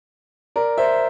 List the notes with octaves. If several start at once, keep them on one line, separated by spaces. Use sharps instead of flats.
A#4 D5
C5 E5